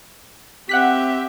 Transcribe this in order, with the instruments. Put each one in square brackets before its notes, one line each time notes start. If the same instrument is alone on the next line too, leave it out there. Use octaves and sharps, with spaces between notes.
[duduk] C4 [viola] G4 E5 [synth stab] F#5 F#6 B6